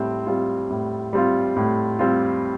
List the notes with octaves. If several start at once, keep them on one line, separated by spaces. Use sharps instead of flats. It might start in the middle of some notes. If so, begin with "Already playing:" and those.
Already playing: A2 G3 C4
G3 C4 F4
A2
G3 C4 F4
A2
G3 C4 F4